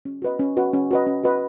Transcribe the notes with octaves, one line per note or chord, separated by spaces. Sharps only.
C#4
F#4 B4 D#5
C#4
F#4 B4 D#5
C#4
F#4 B4 D#5
C#4
F#4 B4 D#5